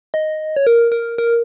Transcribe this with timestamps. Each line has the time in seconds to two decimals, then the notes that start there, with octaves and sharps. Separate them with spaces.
0.14 D#5
0.56 C#5
0.67 A#4
0.92 A#4
1.18 A#4